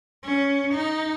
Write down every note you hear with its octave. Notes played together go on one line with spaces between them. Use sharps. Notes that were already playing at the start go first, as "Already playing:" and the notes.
C#4
D#4